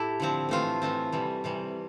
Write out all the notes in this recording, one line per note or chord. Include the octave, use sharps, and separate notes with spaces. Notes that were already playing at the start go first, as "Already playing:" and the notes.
Already playing: A2 E4 G4 A4
D3 F3 C4
A2 E3 A3 C4 F4
A2 E3 A3 C4
C3 E3 G3
C3 E3 G3